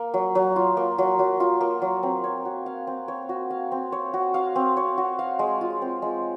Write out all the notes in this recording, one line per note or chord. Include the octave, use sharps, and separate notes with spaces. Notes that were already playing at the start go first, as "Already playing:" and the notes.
Already playing: A#3
F#3
F#3
F4
A#3
F#3
F#3
F4
A#3
F#3
C4
C#5
F#4
F5
C4
C#5
F#4
F5
C4
C#5
F#4
F5
C4
C#5
F#4
F5
G#3
F4
C4
G#3